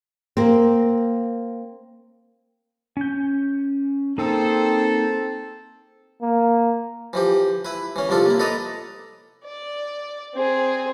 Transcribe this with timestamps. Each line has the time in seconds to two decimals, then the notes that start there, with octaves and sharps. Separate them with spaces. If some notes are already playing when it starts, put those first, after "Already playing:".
0.37 A#3 C4
2.97 C#4 G6
4.18 A#3 C4 D#4 G#4 A4
6.21 A#3
7.13 E3 F3 G4
7.65 E4 B4
7.96 E3 C#4
8.09 C2 F3 D4 F4 A4
8.26 A#3 E4
8.39 A4 B4 D5 D#5 A5 A#5
9.45 D5
10.34 C4 G#4